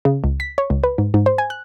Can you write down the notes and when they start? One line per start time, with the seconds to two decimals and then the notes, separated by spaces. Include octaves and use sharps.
0.05 C#3
0.24 C#2
0.40 B6
0.58 C#5
0.70 C#2
0.84 B4
0.98 G#2
1.14 G#2
1.26 C5
1.38 G#5
1.50 F#6